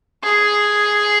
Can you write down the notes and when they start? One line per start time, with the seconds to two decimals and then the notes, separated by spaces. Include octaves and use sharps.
0.23 G#4